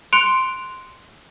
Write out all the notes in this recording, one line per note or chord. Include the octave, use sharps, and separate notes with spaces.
C6 F#6 C#7 D7 F7